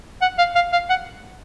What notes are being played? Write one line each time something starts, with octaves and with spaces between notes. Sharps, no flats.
F#5
F5
F5
F5
F#5